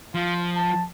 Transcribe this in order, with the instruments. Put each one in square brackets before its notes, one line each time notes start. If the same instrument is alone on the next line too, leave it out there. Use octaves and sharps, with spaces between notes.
[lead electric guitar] F3 [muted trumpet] F4
[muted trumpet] A5